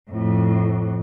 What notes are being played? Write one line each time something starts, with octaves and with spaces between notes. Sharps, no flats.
F2 A2